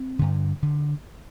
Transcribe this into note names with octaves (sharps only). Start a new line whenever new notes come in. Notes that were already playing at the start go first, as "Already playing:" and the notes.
Already playing: C4
G2 D3
D3